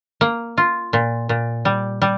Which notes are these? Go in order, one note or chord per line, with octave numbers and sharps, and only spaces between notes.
A#3
F4
A#2
A#2
G3
G3